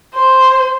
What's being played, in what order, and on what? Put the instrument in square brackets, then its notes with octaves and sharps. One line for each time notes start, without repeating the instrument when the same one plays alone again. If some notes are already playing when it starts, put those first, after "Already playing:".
[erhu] C5